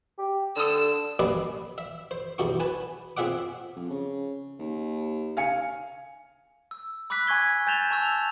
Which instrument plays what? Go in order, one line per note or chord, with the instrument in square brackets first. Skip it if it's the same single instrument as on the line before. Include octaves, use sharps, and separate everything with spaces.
[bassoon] G4
[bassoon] D3 [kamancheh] E6
[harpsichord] G3 A#3 C#4 B4 D5 D#5
E5
C5
B1 E2 G4 C#6
B4 G#5 A5
C4 F4 G#4 E5 F#5 D6
[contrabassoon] F2
C#3
D#2
[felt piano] F5 G#5 C#7
[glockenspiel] E6
B5 D6 E6 F#6 B6
G#5 C#6 G#6 G7
G#5 G6 A6 E7 F7 G7
A5 C#6 E6
F7